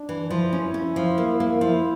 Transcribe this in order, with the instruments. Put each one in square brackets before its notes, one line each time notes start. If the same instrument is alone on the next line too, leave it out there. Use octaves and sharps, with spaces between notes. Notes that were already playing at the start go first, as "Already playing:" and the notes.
Already playing: [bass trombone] D4
[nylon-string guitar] E3
[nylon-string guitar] F3 [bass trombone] E4
[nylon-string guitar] C#4
C#4
F3
A#3
A#3
[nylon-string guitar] F3 [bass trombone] E4